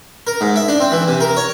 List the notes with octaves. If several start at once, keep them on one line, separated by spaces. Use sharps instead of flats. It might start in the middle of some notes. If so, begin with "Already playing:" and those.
A#4
G#2
E5
D4
C4
E3
C3
A#4
C#5